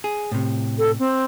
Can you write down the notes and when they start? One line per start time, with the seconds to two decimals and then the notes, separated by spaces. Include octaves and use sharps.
0.04 G#4
0.32 A2 C3
0.78 A4
0.99 C4